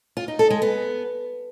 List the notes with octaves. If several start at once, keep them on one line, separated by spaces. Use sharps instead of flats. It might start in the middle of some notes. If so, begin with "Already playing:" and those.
F4
D#4
A4
G#3
B3